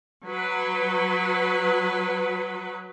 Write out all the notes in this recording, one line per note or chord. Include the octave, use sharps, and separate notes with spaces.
F#3 B4